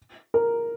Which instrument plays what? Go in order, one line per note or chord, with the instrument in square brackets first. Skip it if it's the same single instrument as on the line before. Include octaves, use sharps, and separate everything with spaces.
[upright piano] A#4